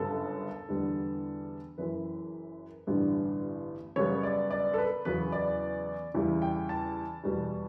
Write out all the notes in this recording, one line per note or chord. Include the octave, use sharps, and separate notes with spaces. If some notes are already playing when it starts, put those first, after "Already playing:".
Already playing: G1 F#2 C#3 G3 B3 A4
E2 D3 G3 B3
F#1 F#2 E3 B4
A1 G2 D3 G3 B3
F#2 C#3 G3 B3 C#5
D5
D5
A4
B4
E2 C#3 F#3 B3 B4
D5
E2 C#3 E3 G3
G5
A5
E2 B2 G3 B3